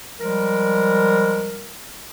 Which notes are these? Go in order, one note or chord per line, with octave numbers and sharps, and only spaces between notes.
F3 G3 G#3 A#4